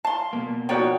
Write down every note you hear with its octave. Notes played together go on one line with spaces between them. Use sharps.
F5 A5 C6
B2 A#3
F3 D#4 F#4 C#5 D5 G5